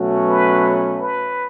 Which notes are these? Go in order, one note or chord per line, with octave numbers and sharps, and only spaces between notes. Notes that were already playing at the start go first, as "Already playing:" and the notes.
Already playing: B2 F#3 A3 C#4 F#4
B4
B4